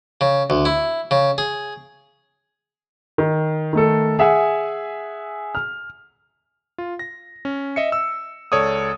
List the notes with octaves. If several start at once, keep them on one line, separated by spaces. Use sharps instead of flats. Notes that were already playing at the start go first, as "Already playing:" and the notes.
C#3
D2
E4
C#3
G#4
D#3
D#3 A3 A4
G#4 E5 F#5 G#5
F6
F4
A#6
C#4
D#5 E5 C#7
E6
C#2 A4 C#5 D5 D#6